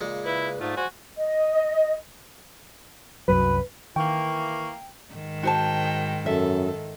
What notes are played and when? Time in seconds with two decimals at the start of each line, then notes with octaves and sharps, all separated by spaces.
0.01 A#2 C#3 G#3
0.25 C#3 E4 B4
0.61 G#2 A3 F4
0.77 F#4 C5 G#5
1.17 D#5
3.28 C2 F#2 F#3 B4
3.96 D#3 E3 A#3 G5 C#6
5.13 G#2 D#3
5.43 F#4 C5 G5 A5
6.26 F#2 A4 E5